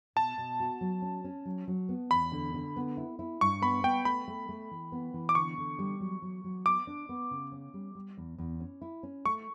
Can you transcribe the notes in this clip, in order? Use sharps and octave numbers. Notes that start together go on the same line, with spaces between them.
B2 A5
B2
F#4
F#3
C#4
C#4
F#3
F#3
B3
E2 B5
D3
D3
B3
E4
E4
G2 C#6
B3 B5
B3 G5
A3 B5
A3
A3
E3
B3
E3
D6
D3 C#6
D3
G3
F#3
F#3
F#3
B3 D6
D4
B3
C#3
C#4
G3
G3
E2
E2
C#4
E4
C#4
A3 C#6